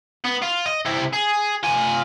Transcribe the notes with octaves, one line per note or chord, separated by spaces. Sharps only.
B3
F4
D#5
C3 E4
G#4
F4 G#5